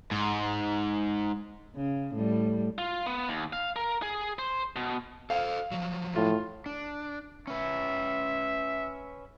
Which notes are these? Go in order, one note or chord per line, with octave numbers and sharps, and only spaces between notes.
G#2
C#3
A2 G3
F4
B3
D#2
F5
A#4
G#4
C5
B2
A4 C5 F5
F3 F#3
A2 F4
D4
C#4 B4 E5